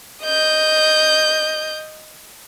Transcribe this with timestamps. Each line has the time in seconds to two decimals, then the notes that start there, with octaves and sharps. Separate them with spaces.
0.24 D#5 G6